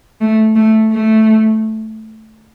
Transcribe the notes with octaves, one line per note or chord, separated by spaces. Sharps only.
A3
A3
A3